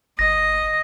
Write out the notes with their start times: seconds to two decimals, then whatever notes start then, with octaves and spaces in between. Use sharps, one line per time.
0.19 G1 D#5 A#6